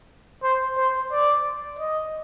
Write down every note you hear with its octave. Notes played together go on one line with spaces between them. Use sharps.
C5
C5
D5
D#5